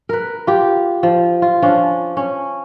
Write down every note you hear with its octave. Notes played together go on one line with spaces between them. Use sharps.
A#4 B4
F4 G4
F3
F4
F3 C#4 D4
C#4